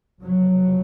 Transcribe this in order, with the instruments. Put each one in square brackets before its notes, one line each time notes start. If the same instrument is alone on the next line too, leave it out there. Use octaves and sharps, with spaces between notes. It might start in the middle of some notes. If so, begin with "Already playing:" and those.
[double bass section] F1 F2 C#3 F#3